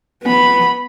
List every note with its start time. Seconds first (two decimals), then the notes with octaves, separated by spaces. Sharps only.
0.23 B3 B5